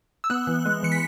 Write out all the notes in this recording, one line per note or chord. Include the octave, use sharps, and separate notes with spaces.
E6
B3 F#6
E3
G#3
E3 C#7
B6